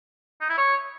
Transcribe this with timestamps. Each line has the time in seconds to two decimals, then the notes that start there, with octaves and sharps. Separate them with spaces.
0.41 D#4
0.49 E4
0.57 C#5